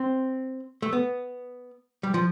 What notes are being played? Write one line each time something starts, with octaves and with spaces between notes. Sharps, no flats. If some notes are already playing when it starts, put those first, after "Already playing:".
Already playing: C4
A3
B3
G3
F3